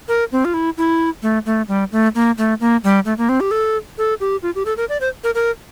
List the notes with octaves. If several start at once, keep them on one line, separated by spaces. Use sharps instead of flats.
A#4
C4
F4
E4
E4
A3
A3
G3
A3
A#3
A3
A#3
G3
A3
A#3
C4
G4
A4
A4
G4
F4
G4
A4
A#4
D5
C5
A#4
A#4